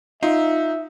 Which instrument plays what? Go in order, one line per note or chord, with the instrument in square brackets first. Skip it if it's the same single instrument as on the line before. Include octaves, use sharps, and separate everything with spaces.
[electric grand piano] D#4 [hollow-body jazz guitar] F4 [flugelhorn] E5